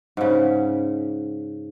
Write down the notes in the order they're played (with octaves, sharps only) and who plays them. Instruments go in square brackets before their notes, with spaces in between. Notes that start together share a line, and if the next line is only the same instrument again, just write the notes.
[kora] G#2 C#3